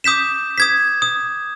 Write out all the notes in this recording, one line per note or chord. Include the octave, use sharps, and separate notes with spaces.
D6 D#6 G6 B6 E7
D#6 G#6 B6
D#6